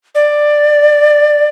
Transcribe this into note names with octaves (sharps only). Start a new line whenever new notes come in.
D5